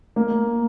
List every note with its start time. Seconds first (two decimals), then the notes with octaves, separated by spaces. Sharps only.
0.16 A#3